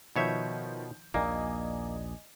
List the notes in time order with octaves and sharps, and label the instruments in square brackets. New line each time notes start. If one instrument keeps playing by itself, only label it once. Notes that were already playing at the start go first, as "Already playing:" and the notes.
[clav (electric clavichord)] B2 C#5 E5 [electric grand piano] D#3 F3 G6
[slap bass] A#1 D#2 [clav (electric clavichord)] A#3 [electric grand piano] D5 D#5 G#5